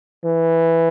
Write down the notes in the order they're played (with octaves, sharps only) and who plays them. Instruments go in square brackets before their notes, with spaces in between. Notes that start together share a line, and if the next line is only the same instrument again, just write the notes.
[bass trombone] E3